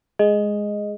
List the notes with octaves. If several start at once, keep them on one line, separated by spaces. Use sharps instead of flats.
G#3 D#5